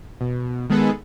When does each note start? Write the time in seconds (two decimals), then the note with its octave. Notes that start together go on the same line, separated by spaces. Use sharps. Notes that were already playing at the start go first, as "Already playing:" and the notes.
0.21 B2
0.70 D#3 G#3 B3 G#4 A4 B4